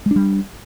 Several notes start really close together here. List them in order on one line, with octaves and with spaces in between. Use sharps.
G#3 D4 G3